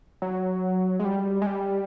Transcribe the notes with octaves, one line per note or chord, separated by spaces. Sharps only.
F#3
G#3
G3
G#3
G3